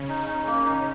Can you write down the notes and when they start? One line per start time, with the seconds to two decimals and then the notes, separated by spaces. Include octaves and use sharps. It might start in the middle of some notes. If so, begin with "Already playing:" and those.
Already playing: C#3 C#4
0.09 D#4
0.27 D#4
0.47 A#3
0.65 D#4